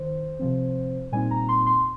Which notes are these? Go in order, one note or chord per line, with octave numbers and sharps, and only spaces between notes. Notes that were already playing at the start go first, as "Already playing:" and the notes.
Already playing: D#3 C5
C3 F3 C4
A#2 G3 C4 D#4 G#5
A#5
C6
C6